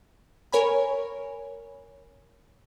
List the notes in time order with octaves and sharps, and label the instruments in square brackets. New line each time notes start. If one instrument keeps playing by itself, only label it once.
[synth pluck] A#4 C#5 G#5 B5